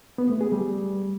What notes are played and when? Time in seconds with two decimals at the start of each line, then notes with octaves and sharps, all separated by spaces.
0.18 B3
0.30 A3
0.41 G#4
0.52 G3